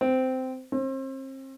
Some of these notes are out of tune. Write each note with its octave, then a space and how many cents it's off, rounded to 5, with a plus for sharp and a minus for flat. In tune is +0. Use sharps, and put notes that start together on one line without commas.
C4 -15
C4 +35